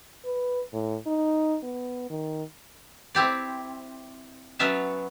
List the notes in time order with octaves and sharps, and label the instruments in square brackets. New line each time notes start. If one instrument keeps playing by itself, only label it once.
[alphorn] B4
A2
D#4
B3
D#3
[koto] C4 E4 G4 D5
F#3 B3 C#4 E5 A5